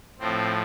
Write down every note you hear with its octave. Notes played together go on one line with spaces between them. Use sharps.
A2 F3 C4